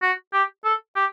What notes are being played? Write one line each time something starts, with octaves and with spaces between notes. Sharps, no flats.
F#4
G4
A4
G4